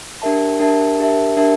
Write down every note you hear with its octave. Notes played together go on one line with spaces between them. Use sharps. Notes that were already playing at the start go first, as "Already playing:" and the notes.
D4 G4 A#4 E5 A5
D4 G4 A#4 E5 A5
D4 G4 A#4 E5 A5
D4 G4 A#4 E5 A5